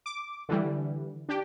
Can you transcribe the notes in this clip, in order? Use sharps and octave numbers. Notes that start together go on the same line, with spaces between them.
D6
D3 E3 G3
D4 G4